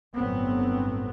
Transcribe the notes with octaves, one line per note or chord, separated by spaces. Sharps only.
G1 A2 F#3 B3 C4